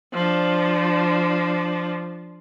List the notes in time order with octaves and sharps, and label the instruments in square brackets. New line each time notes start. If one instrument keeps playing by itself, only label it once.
[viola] F3 D4